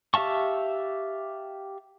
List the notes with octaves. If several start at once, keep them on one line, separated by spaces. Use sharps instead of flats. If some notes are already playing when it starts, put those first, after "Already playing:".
G4 E5 F5 A5 C#6